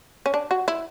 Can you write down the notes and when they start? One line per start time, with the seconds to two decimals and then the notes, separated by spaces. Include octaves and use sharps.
0.26 C#4
0.34 D4
0.51 F#4
0.68 E4